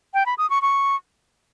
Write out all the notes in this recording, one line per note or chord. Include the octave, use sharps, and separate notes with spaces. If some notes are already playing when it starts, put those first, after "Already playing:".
G5
B5
D#6
C#6
C#6